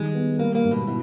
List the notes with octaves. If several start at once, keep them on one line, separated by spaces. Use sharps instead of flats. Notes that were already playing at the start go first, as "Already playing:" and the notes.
Already playing: D#3 G3 G#3
B3
G3 A#3
A#3
G#2
B2
B2 E4